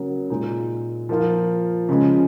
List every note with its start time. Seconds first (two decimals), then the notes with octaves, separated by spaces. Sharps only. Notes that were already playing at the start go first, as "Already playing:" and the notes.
Already playing: C#3 F#3 A#3
0.30 A#2 G#3 D#4
1.09 F3 A#3 F4
1.89 C#3 F3 G#3 C#4